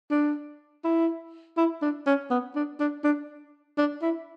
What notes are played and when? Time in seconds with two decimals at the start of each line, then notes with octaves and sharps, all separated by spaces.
0.11 D4
0.84 E4
1.57 E4
1.82 D4
2.07 C#4
2.30 B3
2.55 D4
2.80 D4
3.04 D4
3.78 D4
4.02 E4